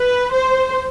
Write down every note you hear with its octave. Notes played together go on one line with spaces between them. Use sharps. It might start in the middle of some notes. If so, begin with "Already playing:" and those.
Already playing: B4
C5